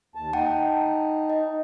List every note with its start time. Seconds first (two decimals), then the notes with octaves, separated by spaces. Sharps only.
0.15 D#2 A5
0.33 D#4 F#5 G5 A5
1.30 D#5